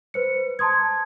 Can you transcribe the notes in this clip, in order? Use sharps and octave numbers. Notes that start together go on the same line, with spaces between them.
B4 C5 C#7
A5 A#5 C6 D#6 G#6